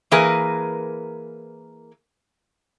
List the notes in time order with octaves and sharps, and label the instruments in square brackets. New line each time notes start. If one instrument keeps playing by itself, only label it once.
[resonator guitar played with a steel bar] E3 A#3 G#4 A#4 B4 G#5